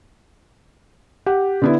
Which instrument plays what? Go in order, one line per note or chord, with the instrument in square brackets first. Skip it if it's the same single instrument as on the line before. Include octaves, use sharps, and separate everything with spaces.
[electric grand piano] G4 [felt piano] F#5
[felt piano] D3 B3 E4